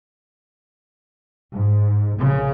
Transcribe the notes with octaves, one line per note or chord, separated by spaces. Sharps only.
G#2
A#1 C#3